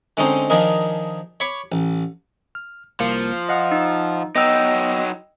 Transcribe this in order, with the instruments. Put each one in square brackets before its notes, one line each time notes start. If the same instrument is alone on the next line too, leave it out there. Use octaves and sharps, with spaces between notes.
[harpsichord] D3 G#3 C4 C#4 D#4 C5
D#3 F3 D4 G#4 A#4 D#5
C#5 B5 C#6 D6
A1
[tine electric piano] F6
[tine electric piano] C2 A#3 C#7 [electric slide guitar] F3
[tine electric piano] D#5 F5 F#5
[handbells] D#4
[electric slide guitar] F#3 D#4 [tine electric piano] B3 [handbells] D#5 G5 E6